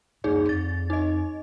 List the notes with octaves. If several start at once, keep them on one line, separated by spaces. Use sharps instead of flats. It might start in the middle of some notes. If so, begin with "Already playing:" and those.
D1 F#2 A#3 D#4 G#4 D5
F2 A6
D#4 D#5